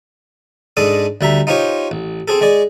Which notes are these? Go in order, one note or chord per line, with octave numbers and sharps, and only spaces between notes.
G#2 G#3 D4 A4 D#6
D2 G3 E5 A#5
D#4 F4 G4 C5 C#5
A1
C4 G#4 A4
G#3 G#4 D5